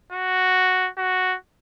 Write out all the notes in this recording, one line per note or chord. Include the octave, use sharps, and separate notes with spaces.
F#4
F#4